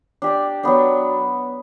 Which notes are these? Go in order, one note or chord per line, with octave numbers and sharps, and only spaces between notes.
D4 G4 D5
F#3 B3 D4